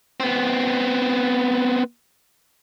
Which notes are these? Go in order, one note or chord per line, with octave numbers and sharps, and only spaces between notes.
B3 C4